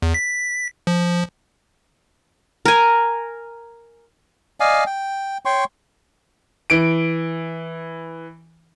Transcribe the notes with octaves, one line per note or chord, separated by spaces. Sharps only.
E2
B6
F3
A#4 G#5
D5 D#5 F5 G#5
G5
C#5 G5 C6 C#6
E3 D7